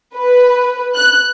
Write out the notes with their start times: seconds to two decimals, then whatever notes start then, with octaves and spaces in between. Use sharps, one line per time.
0.16 B4
0.95 F#6